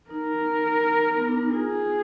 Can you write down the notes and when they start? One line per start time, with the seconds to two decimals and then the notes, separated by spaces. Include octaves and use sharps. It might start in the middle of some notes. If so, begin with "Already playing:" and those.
0.10 D#4 A#4
1.16 B3
1.28 D4
1.40 D#4
1.53 F4 G#4